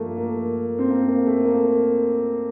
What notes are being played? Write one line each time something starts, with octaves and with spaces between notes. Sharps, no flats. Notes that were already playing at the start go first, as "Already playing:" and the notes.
Already playing: G2 F3 A3 A#3
A#3
C4
A#3
A#3
A3
A#3